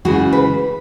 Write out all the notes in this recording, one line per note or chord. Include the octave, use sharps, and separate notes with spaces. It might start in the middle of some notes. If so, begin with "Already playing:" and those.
C#3 E3 G#3 F#4
B4